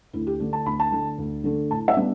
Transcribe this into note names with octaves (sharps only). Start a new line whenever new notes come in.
D2 E4
G4
D3 A3 D4
A5
D2 B5
A5
D3 A3 D4
D2
D3 A3 D4
A2 A5
E5
G3 B3 D4